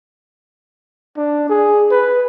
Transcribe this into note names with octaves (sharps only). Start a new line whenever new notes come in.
D4
G#4
B4